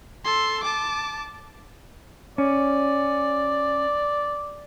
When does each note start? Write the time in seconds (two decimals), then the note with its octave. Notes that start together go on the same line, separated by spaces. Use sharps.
0.25 A4 C6
0.63 A5 D6
2.38 C#4 D5